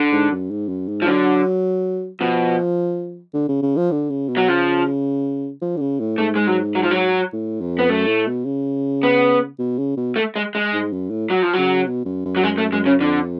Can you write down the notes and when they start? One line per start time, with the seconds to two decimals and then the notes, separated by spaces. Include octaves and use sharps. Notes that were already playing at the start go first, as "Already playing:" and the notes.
Already playing: D3
0.12 G#2
0.31 F#2
0.51 G#2
0.69 F#2
0.88 G#2
1.02 F3
1.07 D3 F#3
2.20 B2 F3
3.34 D3
3.48 C#3
3.62 C#3
3.77 F3
3.92 D3
4.10 C#3
4.29 B2
4.37 F#3
4.48 C#3 F3
5.62 F3
5.77 D3
5.81 C#3
6.00 A2
6.18 G#2 A3
6.35 G#3
6.47 F#3
6.75 F#3
6.83 F3
6.91 F#3
7.33 A2
7.61 F2
7.79 B3
7.89 F#2 A3
8.07 A2
8.27 B2
8.45 C#3
9.03 B3
9.59 B2
9.78 C#3
9.97 B2
10.16 A3
10.36 G#3
10.55 G#3
10.73 G#2
10.93 F#2
11.11 A2
11.30 F#3
11.42 F3
11.53 C#3 F#3
11.87 B2
12.05 F#2
12.25 F#2
12.36 F#3
12.43 F#2 G#3
12.58 A3
12.72 F#2 G#3
12.86 C#3
13.00 F2 D3